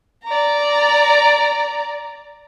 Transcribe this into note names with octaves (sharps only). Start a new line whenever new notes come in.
D5 A#5